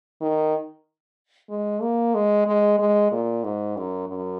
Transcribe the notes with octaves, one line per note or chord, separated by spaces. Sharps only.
D#3
G#3
A#3
G#3
G#3
G#3
A#2
G#2
F#2
F#2